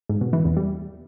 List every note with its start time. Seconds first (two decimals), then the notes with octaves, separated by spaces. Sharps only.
0.09 G#2
0.21 B2
0.33 E3
0.45 E2
0.57 G3